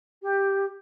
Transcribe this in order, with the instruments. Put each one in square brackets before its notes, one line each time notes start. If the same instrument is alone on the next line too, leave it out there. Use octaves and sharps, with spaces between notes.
[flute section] G4